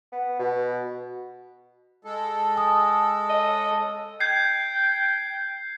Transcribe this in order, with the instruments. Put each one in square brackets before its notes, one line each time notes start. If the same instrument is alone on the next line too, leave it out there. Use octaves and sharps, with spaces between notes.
[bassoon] B3
B2
[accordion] G#3 A4
[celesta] G#5 D#6
[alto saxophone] D#5
[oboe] G5 [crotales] G6 G#6 C7